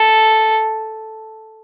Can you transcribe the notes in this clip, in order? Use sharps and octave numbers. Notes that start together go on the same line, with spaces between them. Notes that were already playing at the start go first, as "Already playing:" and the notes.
Already playing: A4